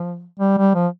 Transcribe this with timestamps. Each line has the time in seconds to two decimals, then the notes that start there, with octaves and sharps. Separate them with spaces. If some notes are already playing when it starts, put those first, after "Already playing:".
Already playing: F3
0.39 G3
0.57 G3
0.74 F3